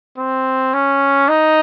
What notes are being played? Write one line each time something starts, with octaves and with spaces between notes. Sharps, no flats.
C4
C#4
D#4